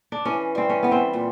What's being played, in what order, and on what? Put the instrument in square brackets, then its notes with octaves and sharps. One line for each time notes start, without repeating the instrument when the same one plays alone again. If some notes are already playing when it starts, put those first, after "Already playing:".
[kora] D4
[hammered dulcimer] E3 [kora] C#4
[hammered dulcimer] G3 [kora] C4
[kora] C#4
[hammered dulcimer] E3 [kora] B3
[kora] C4
[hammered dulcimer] A#2